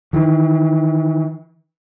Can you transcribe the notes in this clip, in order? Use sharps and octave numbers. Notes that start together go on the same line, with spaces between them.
D#3 E3